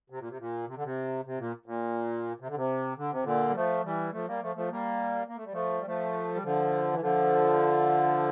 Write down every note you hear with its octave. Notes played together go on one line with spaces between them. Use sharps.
C3
A#2
C3
A#2
C3
D3
C3
C3
A#2
A#2
C3
D3
C3
D3
C3
A#2 D3
G3
F3 A3
E3 G3
F3 A3
G3 A#3
F3 A3
F3 A3
G3 A#3
A#3
A3
G3
F3 A3
G3
F3 A3
G3
D3 F3
E3
D3 F3